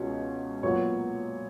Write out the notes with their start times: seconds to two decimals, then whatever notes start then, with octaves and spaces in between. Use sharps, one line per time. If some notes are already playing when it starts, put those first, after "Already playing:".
Already playing: C#2 B2 G#3 C#5
0.63 A#2 F#3 B3 C#5